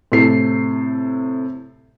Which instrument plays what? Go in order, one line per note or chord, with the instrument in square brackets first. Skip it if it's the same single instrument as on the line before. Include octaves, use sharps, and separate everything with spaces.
[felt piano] A2 C3 A4 C7